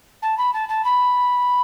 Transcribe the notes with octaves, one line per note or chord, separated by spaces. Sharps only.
A5
B5
A5
A5
B5